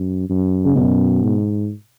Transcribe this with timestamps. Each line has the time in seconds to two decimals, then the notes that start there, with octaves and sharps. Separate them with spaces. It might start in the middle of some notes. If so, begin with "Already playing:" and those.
Already playing: F#2
0.30 F#2
0.65 C#3
0.75 F#2 B2
1.23 G#2